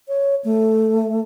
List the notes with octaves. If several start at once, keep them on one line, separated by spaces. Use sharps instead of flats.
C#5
A3